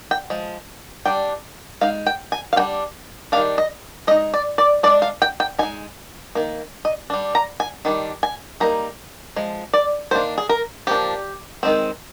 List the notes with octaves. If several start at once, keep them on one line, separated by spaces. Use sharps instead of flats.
G5
F3 G#3
G3 D4 G5
G#3 D#4 F5
G5
G#5
F5
G3 D4 G5
D#3 G3 A#3 D4 F5
D#5
G#3 D#4 D#5
D5
D5
G#3 D4 D5
F5
G5
G5
G#3 D#4 G#5
D#3 A#3
D#5
G3 D4
A#5
G#5
D#3 G3 D4
G#5
G3 A#3 D#4 A#5
F3 G#3
D5
D#3 A#3 D4 C5
G#4
A#4
F3 A#3 D4 G4
D#3 G#3 C4